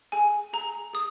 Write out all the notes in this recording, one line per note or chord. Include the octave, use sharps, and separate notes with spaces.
G#4 G#5
G#4 A#5
G#4 D#6